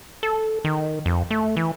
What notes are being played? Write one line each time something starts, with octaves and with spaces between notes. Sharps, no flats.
A4
D#3
F2
A3
E3